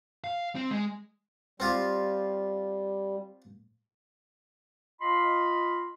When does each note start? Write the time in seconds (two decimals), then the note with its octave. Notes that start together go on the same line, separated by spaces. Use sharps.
0.24 F5
0.55 C4
0.71 G#3
1.60 G3 C4 F4 G4
5.01 F4 D#5 B5 C6